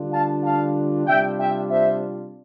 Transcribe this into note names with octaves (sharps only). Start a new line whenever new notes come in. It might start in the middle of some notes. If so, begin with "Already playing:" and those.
Already playing: D3 G3 D4 F4
F5 A5
F5 A5
C3 G3 D4 F4 E5 G5
E5 G5
C5 E5